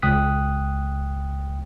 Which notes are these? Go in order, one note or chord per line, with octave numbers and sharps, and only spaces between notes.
C#2 G5 D#6 F#6 B6